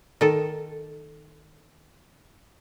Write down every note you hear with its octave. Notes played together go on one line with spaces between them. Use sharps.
D#3 A4